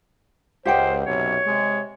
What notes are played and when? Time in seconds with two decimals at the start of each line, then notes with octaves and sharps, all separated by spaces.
0.65 C#2 G4 C5 F#5 G5
1.06 B1 F#2 C3 C#5
1.45 C3 G#3